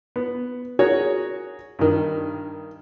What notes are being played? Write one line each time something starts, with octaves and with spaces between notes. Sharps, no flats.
B3
F#4 G#4 A#4 C#5
G2 D#3